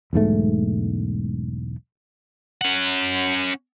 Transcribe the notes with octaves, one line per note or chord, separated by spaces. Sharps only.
E1 B1 G#2 A3
C#4 F#5